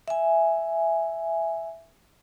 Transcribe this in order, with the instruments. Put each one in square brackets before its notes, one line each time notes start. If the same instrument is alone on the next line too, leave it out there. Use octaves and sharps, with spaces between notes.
[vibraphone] E5 G#5